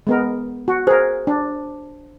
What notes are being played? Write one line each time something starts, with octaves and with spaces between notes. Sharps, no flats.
G#3 B3 A#4
F#4
G#4 A#4 C5
D4